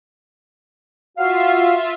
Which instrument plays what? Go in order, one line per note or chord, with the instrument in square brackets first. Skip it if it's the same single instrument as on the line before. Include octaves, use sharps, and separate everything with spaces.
[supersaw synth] F4 E5 [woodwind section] F#4 F5